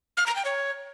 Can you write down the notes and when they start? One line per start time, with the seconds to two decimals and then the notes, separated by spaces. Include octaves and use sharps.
0.17 F6
0.26 A#5
0.36 G5
0.45 C#5